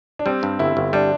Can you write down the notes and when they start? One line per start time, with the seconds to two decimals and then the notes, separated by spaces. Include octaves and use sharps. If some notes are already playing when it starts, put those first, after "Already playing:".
0.19 D4
0.26 G3 C4
0.43 G2
0.59 G1 E4
0.77 G1
0.93 G3 D4